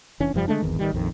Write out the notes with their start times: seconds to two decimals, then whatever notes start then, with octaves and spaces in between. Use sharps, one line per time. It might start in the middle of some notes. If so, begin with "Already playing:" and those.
0.20 F1 E3 C#4 D4
0.34 F1 F#2 F3 G3
0.48 D3 G#3 A3 D4
0.62 D1 G#1 E2 D#3
0.79 A1 D#3 G3
0.93 A#1 F2 D#3